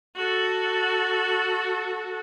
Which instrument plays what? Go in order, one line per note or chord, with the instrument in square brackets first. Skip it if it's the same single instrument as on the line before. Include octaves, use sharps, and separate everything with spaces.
[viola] F#4 A4